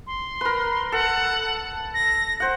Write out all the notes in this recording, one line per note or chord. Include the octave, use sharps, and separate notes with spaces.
C6
A#4 B4
A4 F#5
A#6
C5 F#5